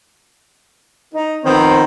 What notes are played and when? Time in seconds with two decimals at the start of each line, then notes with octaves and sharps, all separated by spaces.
1.14 D#4
1.45 D#3 F3 B3 C4 A#4 C5